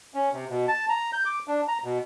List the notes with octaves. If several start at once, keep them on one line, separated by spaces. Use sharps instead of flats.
C#4
C3
B2
A5
A#5
G6
D6
D4
A#5
B2